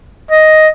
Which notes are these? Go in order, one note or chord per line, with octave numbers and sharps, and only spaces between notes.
D#5